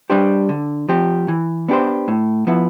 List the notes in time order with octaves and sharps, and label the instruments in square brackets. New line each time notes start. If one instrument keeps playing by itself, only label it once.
[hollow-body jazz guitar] G3 D4 G4 C5
D3
F3 C4 G4
E3
B3 D4 G4 C5
A2
F3 B3 E4